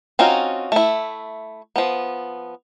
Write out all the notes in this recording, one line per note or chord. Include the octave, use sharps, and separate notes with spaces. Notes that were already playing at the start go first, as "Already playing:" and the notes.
C4 C#4 D#4 F4 F#4
A3 E4
F3 B3